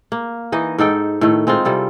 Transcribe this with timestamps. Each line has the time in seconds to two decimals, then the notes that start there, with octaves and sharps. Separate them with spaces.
0.12 A#3
0.52 E3 D#4 D#5
0.78 G#2 D#4 A4 G5
1.21 A2 D#3 A3
1.47 G#3 C4 D#4 F4
1.65 C3 G3 A4